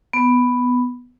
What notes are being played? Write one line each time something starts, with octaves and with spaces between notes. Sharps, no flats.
B3